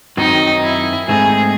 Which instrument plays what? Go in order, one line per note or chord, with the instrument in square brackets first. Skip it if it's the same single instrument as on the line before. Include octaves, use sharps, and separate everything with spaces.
[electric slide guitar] F#2 D#3 F#3 C4 [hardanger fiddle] D#4
[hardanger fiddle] E4
[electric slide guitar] G#2 D#3 A3 C4 D#4 [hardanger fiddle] G#4